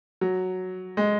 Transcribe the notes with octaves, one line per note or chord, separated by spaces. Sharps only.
F#3
G#3